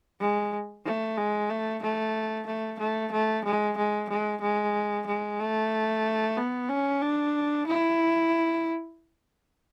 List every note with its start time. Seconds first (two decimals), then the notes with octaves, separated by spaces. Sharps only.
0.21 G#3
0.85 A3
1.18 G#3
1.50 A3
1.83 A3
2.47 A3
2.80 A3
3.12 A3
3.45 G#3
3.78 G#3
4.10 G#3
4.42 G#3
5.07 G#3
5.40 A3
6.37 B3
6.69 C#4
7.02 D4
7.67 E4